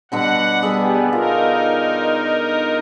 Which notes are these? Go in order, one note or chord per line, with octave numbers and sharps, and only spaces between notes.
B2 D3 G3 F#5
G3 B3 G#4 A4 B5
D#4 F4 A#4